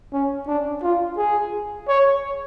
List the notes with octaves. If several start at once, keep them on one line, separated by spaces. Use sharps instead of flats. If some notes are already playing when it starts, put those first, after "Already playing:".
C#4
D4
F4
G#4
C#5